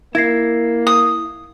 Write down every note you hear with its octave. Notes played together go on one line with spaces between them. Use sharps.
A#3 E4 G#6 A#6 C7
D#6